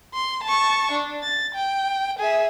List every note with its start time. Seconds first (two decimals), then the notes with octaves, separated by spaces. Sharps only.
0.14 C6
0.44 A5 C#6
0.92 D4
1.23 A6
1.55 G5
2.19 G#4 E5